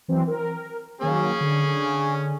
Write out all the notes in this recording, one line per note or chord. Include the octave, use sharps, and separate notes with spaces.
E3 F#3 C4
A#4
D#3 F#3 A#3 C#4 G#4
D3